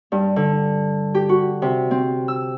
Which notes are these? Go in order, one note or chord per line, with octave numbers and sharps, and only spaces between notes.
G2
D3
G4
F#4
C3
C4
E6